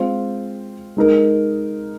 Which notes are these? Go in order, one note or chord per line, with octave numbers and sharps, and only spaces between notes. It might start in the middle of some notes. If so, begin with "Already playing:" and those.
Already playing: G#3 C4 F4
G#3 D#4 A#4